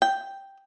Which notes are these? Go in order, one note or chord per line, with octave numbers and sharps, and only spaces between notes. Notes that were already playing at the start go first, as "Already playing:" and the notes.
G5